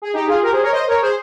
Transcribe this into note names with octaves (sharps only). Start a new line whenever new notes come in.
G#4
D#4 G4
F4 G#4
G4 A#4
G#4 C5
A#4 C#5
C5 D#5
A#4 C#5
G#4 C5